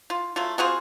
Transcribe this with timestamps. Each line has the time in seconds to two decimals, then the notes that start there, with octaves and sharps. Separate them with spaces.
0.10 F4
0.36 F#3 A3 F4
0.58 C4 F4 F#4 G#4